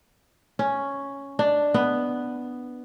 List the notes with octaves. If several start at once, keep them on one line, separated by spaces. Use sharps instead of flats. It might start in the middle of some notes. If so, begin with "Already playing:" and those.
C#4
D4
B3